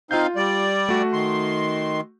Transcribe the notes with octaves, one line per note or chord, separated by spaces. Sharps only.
C4 D#4 F4 F5 G6
G3 D5
A3 F#4
D#3 C6